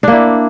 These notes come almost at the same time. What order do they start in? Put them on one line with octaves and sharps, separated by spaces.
D4 A#3 E4